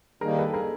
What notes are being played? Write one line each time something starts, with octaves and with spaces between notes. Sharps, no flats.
D#3 G3 A#3 D#4 G#4 A#4
A4 B4
G#4 A#4